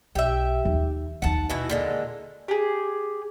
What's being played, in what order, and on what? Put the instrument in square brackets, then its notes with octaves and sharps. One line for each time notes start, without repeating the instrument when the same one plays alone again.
[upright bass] B1 [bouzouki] G4 E5
[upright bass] D#2
[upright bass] D#2 D#3 [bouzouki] F#5 A5
[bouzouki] B2 E3 E4
A#2 D3 G#3
[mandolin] G4 G#4